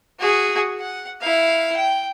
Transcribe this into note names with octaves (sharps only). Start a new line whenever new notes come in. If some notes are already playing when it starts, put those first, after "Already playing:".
F#4 G#4
F#5
E4 F5
G5